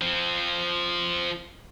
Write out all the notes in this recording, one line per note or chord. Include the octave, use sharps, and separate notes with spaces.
F3 C4